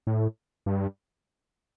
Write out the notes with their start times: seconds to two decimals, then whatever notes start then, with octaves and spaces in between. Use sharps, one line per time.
0.07 A2
0.66 G2